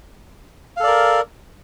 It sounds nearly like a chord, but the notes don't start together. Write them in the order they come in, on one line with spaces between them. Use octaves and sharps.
F5 A4 D5 A#4